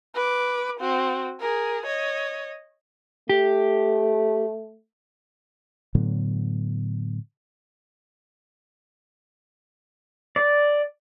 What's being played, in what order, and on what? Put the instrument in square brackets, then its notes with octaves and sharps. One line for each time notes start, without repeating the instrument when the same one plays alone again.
[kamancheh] B4 D6
C4 F#4
G#4 A#4
C#5 D#5
[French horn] A3 [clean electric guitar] G4
[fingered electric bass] A2 D3 F#3 B3
[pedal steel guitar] D5